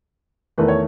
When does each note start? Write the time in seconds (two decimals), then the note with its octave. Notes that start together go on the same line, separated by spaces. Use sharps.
0.58 E2 D#3 A3 B4
0.68 C#5